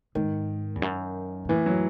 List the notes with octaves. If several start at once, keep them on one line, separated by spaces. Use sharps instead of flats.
G#2 D#3
E2
F#2
B2
A2 E3
F#3